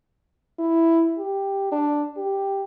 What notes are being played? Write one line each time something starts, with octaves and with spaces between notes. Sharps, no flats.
E4
G4
D4
G4